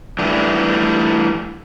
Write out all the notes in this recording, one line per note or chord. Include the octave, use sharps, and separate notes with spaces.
E3 G3 A3 D4